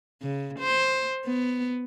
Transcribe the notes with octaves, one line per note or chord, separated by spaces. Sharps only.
C#3
C5
B3